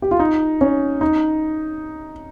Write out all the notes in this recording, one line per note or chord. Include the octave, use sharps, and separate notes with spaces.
G4
F4
D#4
C#4
D#4